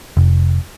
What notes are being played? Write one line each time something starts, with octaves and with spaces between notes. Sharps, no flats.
F1